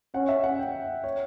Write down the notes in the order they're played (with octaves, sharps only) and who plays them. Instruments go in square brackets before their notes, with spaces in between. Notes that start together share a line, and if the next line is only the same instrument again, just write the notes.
[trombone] C#4 [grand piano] F#5
[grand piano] E5
F#5
G5
C#5